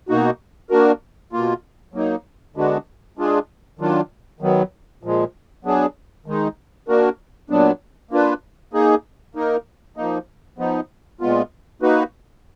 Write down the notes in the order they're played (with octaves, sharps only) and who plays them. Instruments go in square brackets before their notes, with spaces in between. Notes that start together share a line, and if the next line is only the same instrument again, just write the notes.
[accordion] B2 A#3 D#4 F#4
A#3 D4 F#4 A#4
B2 A#3 F4
F#3 A#3 D#4
D3 G#3 B3 D4 F#4
G#3 D4 F4 G#4
D#3 F#3 D4 F4
D#3 F#3 B3
A#2 F3 G#3
F#3 B3 D4 G#4
D#3 G#3 D#4
A#3 D4 F#4 A#4
A#2 F#3 B3 D4
A#3 D4 F4 B4
A#3 D#4 G#4
A#3 D#4 A#4
F3 A#3 D#4
F3 B3 D#4
A#2 G#3 B3 F4
A#3 D#4 F#4 B4